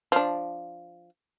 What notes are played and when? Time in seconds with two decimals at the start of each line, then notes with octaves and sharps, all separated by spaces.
0.12 F3 D4